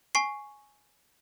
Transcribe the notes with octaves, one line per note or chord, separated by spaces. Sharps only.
G#5 C#6 C7